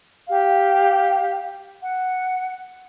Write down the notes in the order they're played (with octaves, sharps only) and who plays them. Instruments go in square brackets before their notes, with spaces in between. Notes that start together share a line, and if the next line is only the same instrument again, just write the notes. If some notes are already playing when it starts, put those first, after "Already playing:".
[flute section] G4 F5
F#5